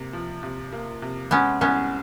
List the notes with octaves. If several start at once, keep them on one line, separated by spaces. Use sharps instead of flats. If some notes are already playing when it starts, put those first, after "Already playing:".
Already playing: C3 A#3
F3
C3
A#3
C3
G#3 B3 C#4
C2 B3 C#4